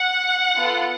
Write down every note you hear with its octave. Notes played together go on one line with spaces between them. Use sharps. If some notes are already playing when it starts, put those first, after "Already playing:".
Already playing: F#5
B3 F4 A4